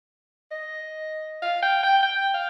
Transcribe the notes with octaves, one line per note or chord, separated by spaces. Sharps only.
D#5
F5
G5
G5
G5
F5